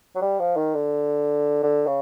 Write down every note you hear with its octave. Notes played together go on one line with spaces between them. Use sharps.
F#3
G3
F3
D#3
D3
D3
C#3